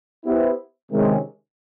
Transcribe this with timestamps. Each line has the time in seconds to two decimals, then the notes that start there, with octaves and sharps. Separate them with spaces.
0.24 B3 E4 G4 C5
0.90 C3 D#3 G#3 C#4